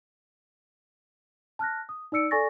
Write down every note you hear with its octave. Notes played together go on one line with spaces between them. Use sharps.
A5 F6 F#6 A#6
D#6
D#4 D5 E6 C#7 D7
A4 D5 G#5 C#6 A6 A#6